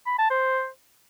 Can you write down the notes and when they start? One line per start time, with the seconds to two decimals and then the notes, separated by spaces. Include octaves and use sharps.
0.06 B5
0.18 A5
0.30 C5